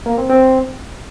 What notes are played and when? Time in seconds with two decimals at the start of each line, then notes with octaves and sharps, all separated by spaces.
0.06 A#3
0.18 C4
0.29 C4